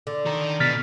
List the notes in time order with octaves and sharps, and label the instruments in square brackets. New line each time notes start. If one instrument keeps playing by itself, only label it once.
[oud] D3
[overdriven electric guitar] D#3 A#4
[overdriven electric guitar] B2 [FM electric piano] F6 A6 B6